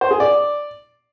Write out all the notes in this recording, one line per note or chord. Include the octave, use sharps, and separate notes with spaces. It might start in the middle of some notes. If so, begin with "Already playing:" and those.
C5
G#4
D5